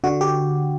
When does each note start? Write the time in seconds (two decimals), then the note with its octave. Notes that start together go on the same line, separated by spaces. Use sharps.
0.04 D3 F#4
0.21 G4